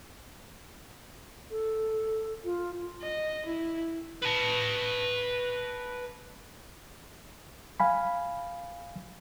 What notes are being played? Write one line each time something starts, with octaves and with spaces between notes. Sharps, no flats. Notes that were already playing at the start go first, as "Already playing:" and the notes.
A4
F4
D#5
E4
B4 A5
F5 G#5 B5